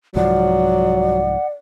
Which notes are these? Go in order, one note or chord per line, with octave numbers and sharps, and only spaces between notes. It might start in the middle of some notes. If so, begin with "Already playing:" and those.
C2 G#2 F3 F#3 D5 F#5